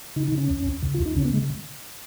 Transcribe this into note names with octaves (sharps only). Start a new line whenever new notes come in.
C#3 D#4
D#4
C#3
C#4
D#2
D#2
C#3
F4
D#2
D#4
C#3 C#4
B3
C#3 G#3